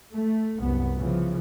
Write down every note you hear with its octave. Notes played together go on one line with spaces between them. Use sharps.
A3
C2 F#2 B3
C#3 E3 F3